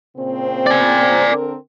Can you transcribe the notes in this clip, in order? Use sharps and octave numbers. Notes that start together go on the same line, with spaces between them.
A#2 C#3 C4
D5 G#5
D3 C4 A#4